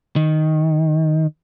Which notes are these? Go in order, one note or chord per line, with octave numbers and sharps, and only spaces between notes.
D#3